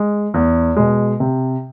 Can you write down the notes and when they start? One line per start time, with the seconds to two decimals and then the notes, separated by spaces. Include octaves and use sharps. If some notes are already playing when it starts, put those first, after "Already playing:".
Already playing: G#3
0.34 E2
0.76 B2 G#3
1.20 C3